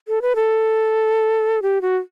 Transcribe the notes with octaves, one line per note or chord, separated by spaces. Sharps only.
A4
B4
A4
G4
F#4